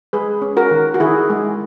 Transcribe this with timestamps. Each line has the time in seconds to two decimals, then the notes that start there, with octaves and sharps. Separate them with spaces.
0.13 G#3 G#4 B4
0.42 C#4
0.57 F#4 A#4
0.71 D#3
0.94 F#4
1.00 D#3 E4 G#4
1.30 G#3